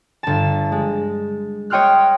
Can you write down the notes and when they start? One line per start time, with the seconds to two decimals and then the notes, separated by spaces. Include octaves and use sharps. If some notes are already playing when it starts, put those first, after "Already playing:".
0.23 G1 A5
0.72 G#3
1.70 C#5 D#5 G5 C6 F6 F#6